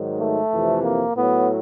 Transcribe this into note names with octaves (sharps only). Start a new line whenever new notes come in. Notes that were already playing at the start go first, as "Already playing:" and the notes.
Already playing: G#2 D#3 F#3
A3
F2 C3 E3
A#3
A2 F#3 B3